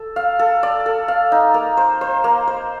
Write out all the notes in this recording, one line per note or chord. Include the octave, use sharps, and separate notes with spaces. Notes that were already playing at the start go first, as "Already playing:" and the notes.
Already playing: A4
F5
A4
D5
A4
F5
D#4
A#3
C5
C5
A#3
C5